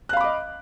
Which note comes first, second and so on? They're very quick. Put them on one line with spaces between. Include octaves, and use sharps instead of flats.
F#6 F5 B5 D6 D#5